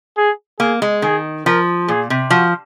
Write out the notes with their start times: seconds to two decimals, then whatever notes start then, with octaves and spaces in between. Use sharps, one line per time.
0.17 G#4
0.60 A#3 G#4
0.82 G#3
1.02 D#3 G#4
1.46 F3 A#4
1.88 A#2 G#4
2.10 C3
2.30 F3 F#4